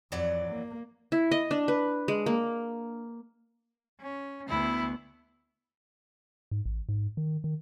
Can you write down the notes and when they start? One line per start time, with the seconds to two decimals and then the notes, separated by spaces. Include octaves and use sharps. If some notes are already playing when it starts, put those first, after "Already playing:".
0.12 F2 E3 F#3 D5
0.49 A#3
1.12 E4
1.31 D#5
1.51 D4
1.68 B4
2.08 G#3
2.26 A#3
4.01 C#4
4.49 D2 B3 E4
6.51 G#2
6.65 A1
6.89 G#2
7.17 D#3
7.44 D#3